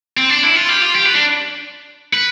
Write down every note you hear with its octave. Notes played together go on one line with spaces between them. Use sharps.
C4
D4
E4
F4
G4
F4
G4
B4
D4
B4